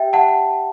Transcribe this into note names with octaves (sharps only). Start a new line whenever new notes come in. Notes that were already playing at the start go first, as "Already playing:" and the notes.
Already playing: G4 E5 G5
F#5 A5